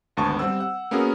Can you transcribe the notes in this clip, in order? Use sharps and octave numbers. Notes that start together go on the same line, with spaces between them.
G#1 D2 B3 A5 C#6
G3 C4 F#5 E6
F#5
A#3 B3 C#4 F#4 G#4 A#4